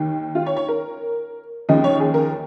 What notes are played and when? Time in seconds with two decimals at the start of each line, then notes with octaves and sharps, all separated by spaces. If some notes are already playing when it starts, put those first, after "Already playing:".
Already playing: D#2 D#3
0.35 F4
0.46 C#5
0.56 C#5
0.68 A#4
1.69 D#2 C#3 F3 D#5
1.84 C#5
2.00 G#4
2.14 A#4